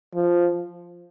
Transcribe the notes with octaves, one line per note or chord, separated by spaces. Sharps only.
F3